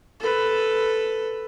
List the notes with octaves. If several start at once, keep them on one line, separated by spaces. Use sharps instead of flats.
A4 B4